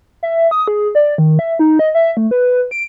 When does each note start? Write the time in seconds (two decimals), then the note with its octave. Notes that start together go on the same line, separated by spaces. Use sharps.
0.23 E5
0.51 D#6
0.68 G#4
0.95 D5
1.18 D#3
1.39 E5
1.59 D#4
1.79 D#5
1.95 E5
2.17 A3
2.31 B4
2.71 D7